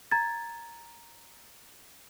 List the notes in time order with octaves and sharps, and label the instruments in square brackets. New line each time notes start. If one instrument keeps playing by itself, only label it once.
[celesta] A#5 G#6 A6